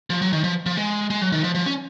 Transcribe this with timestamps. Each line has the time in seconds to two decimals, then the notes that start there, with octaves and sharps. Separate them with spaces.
0.10 F3
0.22 F#3
0.33 D#3
0.44 F3
0.66 F3
0.77 G#3
1.10 G#3
1.21 F#3
1.32 D#3
1.44 F3
1.55 F3
1.66 C#4